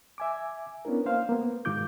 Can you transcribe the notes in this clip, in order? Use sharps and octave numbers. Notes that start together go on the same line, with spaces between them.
E5 G#5 D6
B3 C#4 D4 E4 A#4
A#3 C5 F5
A#3 B3
G#2 D#3 F4 D6 G6